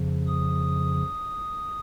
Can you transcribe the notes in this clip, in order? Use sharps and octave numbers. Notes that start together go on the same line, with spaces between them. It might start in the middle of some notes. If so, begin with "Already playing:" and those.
Already playing: F2 C#3 F3
D#6